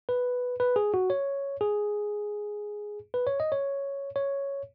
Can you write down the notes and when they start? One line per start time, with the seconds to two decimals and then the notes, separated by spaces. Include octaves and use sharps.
0.09 B4
0.60 B4
0.76 G#4
0.94 F#4
1.10 C#5
1.61 G#4
3.14 B4
3.27 C#5
3.40 D#5
3.52 C#5
4.16 C#5